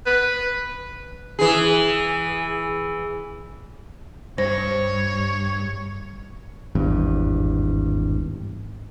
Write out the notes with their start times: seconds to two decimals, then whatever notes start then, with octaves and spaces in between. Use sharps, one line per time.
0.06 B4
1.39 E3 G#4
4.38 G2 C5 C#5
6.75 G#1 E2 G2